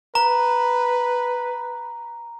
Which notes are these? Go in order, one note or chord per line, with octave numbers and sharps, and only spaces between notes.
B4 A#5